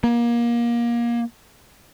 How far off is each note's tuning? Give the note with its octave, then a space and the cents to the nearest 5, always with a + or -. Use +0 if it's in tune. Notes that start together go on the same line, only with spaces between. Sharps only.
A#3 +25